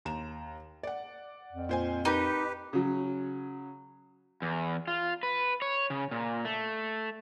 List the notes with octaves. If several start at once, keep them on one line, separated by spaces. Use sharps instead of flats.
D#2 A#5 E7
D5 F#5
F2
A#2 C5 G#5
D#4 G4 A#4 B4 D6
C#3 F#3
E2
F4
B4
C#5
C#3
A#2
A3